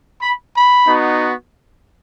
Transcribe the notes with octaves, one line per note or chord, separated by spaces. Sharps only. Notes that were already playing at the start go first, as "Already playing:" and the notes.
B5
B5
B3 D#4 F#4